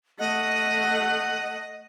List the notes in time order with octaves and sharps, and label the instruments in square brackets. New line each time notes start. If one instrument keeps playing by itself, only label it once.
[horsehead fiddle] A3 F#5 [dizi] D#5